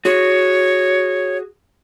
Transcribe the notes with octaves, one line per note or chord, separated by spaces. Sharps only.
F#4 G#4 C#5